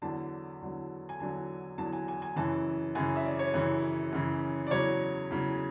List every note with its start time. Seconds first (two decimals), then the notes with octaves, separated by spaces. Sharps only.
0.02 E2 D3 F#3 A5
0.61 E2 D3 F#3
1.09 G#5
1.19 E2 D3 F#3 A5
1.78 E2 D3 F#3 A5
1.93 G#5
2.08 G#5
2.22 G#5
2.36 F#2 C#3 E3 A5
2.95 F#2 C#3 E3 G#5
3.16 E5
3.25 D5
3.39 C#5
3.54 F#2 C#3 E3
4.13 F#2 C#3 E3
4.67 D5
4.71 E2 C#3 F#3 C#5
5.30 E2 C#3 F#3